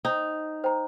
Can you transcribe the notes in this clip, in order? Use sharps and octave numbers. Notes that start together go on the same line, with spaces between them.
D#4 C5 G5 A#5
C5 G5 A#5